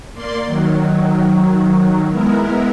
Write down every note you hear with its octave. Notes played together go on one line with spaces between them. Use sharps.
A#3 D5 C6
D#3 F#3
G#3 B3 E4 A#4